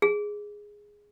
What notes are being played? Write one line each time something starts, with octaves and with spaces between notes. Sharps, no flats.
G#4